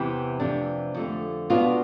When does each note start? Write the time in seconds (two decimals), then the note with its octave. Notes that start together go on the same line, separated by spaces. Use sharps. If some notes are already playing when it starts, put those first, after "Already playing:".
Already playing: E2 C3 E3 E4 G4
0.40 F2 C3 E3 A3 D4
0.94 F2 D3 A3
1.50 B2 B3 D4 F4